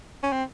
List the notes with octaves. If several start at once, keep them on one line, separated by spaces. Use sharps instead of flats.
C#4
C4